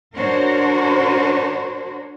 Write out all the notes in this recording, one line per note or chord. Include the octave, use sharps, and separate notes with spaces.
D4 F#4 A#4 C5 C#5